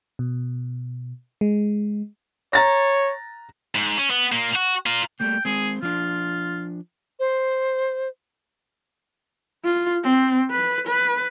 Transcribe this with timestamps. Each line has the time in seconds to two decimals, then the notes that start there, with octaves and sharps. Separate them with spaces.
0.19 B2
1.41 G#3
2.53 C#5 A#5 A6 A#6
3.75 G#2
3.98 C#4
4.10 B3
4.32 A#2 A#3
4.56 F#4
4.86 F4 A#4
5.20 G3 A3 A#3 G5
5.45 G#3 C4 G#4
5.83 F3 D4 F4
7.19 C5
9.65 F4
10.04 C4
10.51 B4
10.87 B4